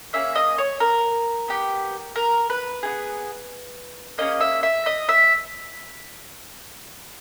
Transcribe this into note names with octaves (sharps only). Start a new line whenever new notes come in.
A#3 C#4 G#4 E5
D#5
C#5
A#4
B3 G4
A#4
B4
B3 D#4 G#4
A#3 C#4 G#4 D#5
E5
E5
D#5
E5